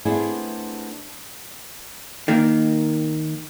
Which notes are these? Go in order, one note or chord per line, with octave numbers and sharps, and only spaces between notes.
A3 B3 C4 D4 E4 G#4
D#3 A#3